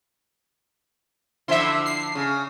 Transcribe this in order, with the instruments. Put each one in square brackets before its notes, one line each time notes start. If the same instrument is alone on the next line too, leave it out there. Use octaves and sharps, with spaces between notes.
[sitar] D3 F3 E4 [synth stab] E5 C6
[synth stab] C7
[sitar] C#3